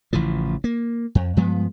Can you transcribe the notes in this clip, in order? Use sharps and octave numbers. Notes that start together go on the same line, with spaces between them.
A1 C#3 E3 F3
A#3
F2
G2 F3 G#3 B3